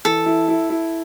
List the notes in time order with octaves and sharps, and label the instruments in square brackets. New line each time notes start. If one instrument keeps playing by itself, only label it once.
[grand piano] E3 [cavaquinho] A4
[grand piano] E4
E4
E4